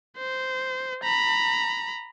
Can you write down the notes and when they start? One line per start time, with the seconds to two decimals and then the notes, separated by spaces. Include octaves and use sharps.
0.18 C5
1.04 A#5 B5